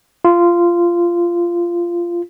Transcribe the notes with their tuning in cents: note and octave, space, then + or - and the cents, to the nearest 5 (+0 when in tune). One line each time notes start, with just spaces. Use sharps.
F4 -15